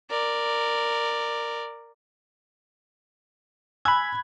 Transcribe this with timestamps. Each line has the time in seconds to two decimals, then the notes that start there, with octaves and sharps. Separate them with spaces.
0.10 A#4 D5
3.85 G#5 B5 E6 F#6 G#6